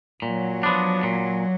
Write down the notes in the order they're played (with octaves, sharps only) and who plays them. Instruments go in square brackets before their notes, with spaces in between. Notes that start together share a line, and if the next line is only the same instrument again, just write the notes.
[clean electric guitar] A#2 [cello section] F#3
[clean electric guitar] F3 B3 D4
A#2